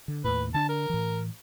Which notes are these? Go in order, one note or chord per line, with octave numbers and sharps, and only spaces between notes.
D3
D#2 A2 B4
D3 D4 A5
A#4
A2 E3